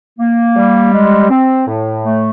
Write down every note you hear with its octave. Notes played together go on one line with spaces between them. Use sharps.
A#3
G3
G#3
C4
A2
A3